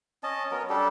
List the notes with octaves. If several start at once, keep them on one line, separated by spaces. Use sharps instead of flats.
C#4 D#5 A5
F#3 B3 C#4 A#4
G3 D4 G4 A4